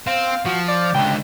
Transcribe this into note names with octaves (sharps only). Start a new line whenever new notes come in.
C4 F5
F3 F#4
D5
C#2 D3 G5